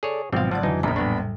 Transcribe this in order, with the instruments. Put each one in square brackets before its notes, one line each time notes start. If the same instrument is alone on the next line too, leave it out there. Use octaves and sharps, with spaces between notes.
[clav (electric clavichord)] G#4 C#5 [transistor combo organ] A4 D5
[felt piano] G#1 [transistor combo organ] B2 F3 [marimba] F#3 [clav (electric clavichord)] C4 F5
[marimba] C#3 F#3 D5 [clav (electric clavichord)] F3 [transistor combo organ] F#5 A5
[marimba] F2 [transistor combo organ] D3 F#3 [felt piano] E3 [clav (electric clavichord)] D#4
[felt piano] A#1 [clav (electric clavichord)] E2 D#3 [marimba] C5 G#5 A#5 [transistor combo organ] B5
[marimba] A2 G3 [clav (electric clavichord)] B3 D4